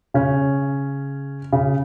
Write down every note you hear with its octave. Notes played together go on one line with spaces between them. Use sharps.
C#3 C#4
C#3